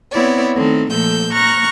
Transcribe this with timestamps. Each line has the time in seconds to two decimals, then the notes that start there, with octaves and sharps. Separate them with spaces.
0.12 B3 C4 E4 C#5 D5
0.56 D#3 A3 C4 A4
0.91 A#2 F3 A3 A4 E6 G6
1.34 A#5 C#6 F6 F#6 A#6